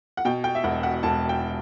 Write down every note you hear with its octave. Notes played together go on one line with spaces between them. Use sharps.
F#5
B2 G5
G5
E5
E1 F#5
F#5
E1 A5
G5